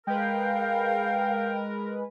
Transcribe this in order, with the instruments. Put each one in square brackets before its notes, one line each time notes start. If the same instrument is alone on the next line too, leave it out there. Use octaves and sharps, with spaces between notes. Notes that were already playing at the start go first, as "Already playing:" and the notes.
[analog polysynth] G#3 B4 [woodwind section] A#4 [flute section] F5 [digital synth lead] G5